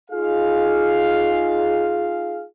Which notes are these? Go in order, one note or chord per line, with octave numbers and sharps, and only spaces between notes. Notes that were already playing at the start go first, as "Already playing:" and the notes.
D#4 F4 G#4 F5